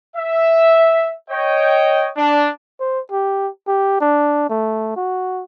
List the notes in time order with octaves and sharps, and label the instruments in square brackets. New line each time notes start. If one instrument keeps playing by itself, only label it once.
[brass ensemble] E5
C#5 D#5 G5
D4
[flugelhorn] C5
G4
G4
D4
A3
F#4